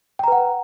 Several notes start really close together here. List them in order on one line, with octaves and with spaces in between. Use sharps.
G5 A#5 B4 F#5